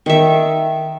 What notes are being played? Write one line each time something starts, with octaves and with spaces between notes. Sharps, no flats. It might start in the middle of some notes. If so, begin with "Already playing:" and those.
D#3 E5